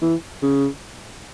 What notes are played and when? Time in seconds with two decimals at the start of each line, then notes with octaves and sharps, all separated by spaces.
0.02 E3
0.42 C#3